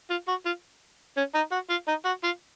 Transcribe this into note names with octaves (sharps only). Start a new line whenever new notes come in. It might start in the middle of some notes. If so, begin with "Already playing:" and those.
F4
F#4
F4
C#4
D#4
F#4
F4
D#4
F#4
F4